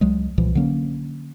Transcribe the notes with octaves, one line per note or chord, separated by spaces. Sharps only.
C#2 F#3 G#3
C2 A#2 E3 F3
D3 F#3 A#3 C#4